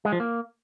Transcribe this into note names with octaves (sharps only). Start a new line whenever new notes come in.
G#3
F3
A#3